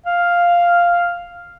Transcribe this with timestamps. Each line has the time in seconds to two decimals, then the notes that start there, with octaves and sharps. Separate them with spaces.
0.06 F5